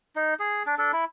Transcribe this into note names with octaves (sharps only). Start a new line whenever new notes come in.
D#4
G#4
D4
D4 A4
E4